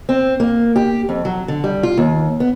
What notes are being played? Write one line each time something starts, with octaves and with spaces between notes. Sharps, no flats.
C4
A#3
G4
F2
F#3
D3
G3
F4
D#2
B3